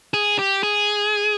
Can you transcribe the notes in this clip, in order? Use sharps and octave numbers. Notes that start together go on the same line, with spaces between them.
G#4
G4
G#4